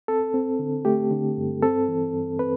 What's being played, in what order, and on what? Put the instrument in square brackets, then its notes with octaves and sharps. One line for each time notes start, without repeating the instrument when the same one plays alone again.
[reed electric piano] C4 A4
C4
D3
A3 G4
D3
G2
C4 A4
E3
G2
C4 B4